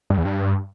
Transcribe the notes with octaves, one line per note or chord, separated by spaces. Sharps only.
G2
E2
G2